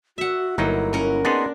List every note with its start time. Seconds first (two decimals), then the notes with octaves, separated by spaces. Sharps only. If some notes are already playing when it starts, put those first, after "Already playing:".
0.18 F#4 E5 F#5
0.58 G1 F#3 A#3 D#4 E4 F#5
0.93 C#4 A#4 F#5
1.25 B3 D4 D#4 G#4 D5 C6